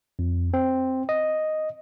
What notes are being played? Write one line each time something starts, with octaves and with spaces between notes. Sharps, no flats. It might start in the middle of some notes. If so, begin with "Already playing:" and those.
F2
C4
D#5